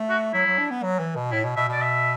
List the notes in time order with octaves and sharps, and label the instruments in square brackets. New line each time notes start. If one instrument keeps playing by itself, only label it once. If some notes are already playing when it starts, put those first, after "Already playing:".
Already playing: [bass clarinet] A3
[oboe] F#4
[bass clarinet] F#3 [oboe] E4
[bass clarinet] F#3
D4
B3
F#3
E3
B2
[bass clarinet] A2 [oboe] E4
[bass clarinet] B2
[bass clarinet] B2 [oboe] E5
[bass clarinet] B2 [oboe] D5
[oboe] E5